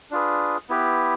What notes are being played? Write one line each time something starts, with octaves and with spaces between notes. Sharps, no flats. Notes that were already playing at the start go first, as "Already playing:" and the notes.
D4 F4 G#4 B4
B3 E4 G4 B4